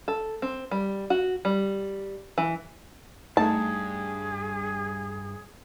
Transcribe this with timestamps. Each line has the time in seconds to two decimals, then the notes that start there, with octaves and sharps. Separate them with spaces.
0.08 A4
0.42 C4
0.71 G3
1.10 F#4
1.45 G3
2.38 E3
3.37 G2 A3 D#4 G#4 A5